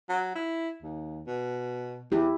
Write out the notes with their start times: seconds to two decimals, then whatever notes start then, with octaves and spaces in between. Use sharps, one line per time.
0.09 F#3
0.35 E4
0.82 D#2
1.27 B2
2.12 E2 E4 G4